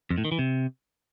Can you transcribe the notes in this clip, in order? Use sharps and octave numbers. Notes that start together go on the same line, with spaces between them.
F2
A2
D#3
E3
C3